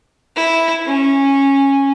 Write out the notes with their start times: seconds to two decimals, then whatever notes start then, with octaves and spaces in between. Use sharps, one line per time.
0.36 E4
0.86 C#4